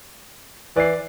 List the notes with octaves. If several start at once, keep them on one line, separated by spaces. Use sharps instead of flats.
E3 D5 C7